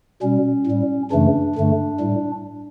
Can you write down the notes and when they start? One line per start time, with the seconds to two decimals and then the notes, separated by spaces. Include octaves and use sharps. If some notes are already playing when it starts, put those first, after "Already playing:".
0.22 B2 G3 C#4
0.67 A2 G3
1.11 F#2 C#3 E3 A3 D4
1.56 G2 D3 A3
2.00 A2 G3